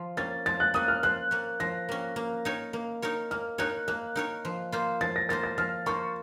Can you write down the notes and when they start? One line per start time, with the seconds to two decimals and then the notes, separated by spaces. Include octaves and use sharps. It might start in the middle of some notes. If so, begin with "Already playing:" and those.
Already playing: F3
0.17 A#3 C#4 A6
0.46 F3 A6
0.60 F#6
0.74 A#3 C#4 D#6
0.88 F6
1.03 F3 F#6
1.31 A#3 C#4
1.60 F3 A#6
1.89 A#3 C#4
2.16 A#3
2.45 D#4 A#4 C#5
2.73 A#3
3.02 D#4 A#4 C#5
3.31 A#3 F6
3.58 D#4 A#4 C#5 F#6
3.88 A#3 F#6
4.16 D#4 A#4 C#5
4.45 F3
4.72 A#3 F4 C5
5.01 F3 A6
5.16 A#6
5.29 A#3 F4 C5 A6
5.44 A6
5.58 F3 F6
5.86 A#3 F4 C5 C#6